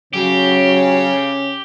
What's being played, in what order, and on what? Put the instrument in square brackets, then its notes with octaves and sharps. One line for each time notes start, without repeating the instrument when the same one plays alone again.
[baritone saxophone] C#3 [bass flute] F#3 [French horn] C#4 [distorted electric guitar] G4